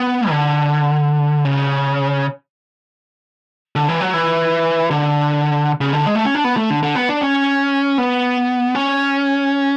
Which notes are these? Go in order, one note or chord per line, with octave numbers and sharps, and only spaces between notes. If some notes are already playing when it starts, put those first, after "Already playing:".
Already playing: B3
D3
C#3
D3
E3
F#3
E3
D3
C#3
D3
G#3
A3
C#4
D4
B3
A3
D3
D3
B3
D4
C#4
B3
C#4